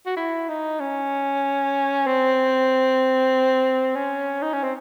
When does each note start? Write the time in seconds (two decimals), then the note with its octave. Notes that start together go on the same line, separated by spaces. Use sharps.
0.06 F#4
0.16 E4
0.49 D#4
0.80 C#4
2.07 C4
3.95 C#4
4.42 D#4
4.53 C#4
4.63 C4